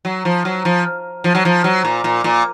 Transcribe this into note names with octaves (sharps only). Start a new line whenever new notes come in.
F#3
F3
F#3
F3
F3
F#3
F3
F#3
A#2
A#2
A#2